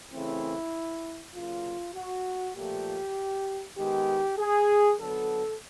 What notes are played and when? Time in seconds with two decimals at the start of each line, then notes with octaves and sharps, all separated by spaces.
0.13 C#3 E3 A3 C4 E4
1.35 C#3 F#3 A#3 F4
1.95 F#4
2.56 A#2 F3 A3 G4
3.78 D#3 G#3 B3 G4
4.39 G#4
5.00 D3 F#3 B3 A4